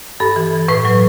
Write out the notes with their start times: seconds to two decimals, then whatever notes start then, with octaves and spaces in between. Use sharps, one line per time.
0.20 G2 A4
0.36 E3
0.53 E3
0.68 A2 B4
0.85 F#3